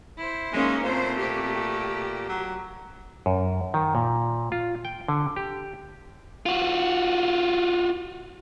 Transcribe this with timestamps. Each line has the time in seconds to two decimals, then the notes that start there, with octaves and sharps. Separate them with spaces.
0.18 E4 C5
0.53 G#3 A#3 C#4 D#4
0.84 A#2 A3 C4 C5
1.19 G4
2.29 F#3
3.26 F#2
3.74 D#3
3.95 A#2
4.52 F4
4.85 G5
5.08 D3
5.36 G4
6.46 F4 F#4